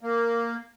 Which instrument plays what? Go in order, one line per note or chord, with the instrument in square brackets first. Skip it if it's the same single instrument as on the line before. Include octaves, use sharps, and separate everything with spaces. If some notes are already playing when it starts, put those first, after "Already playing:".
[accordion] A#3